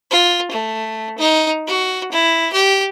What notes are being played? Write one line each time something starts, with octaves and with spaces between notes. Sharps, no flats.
F4
A3
D#4
F#4
E4
G4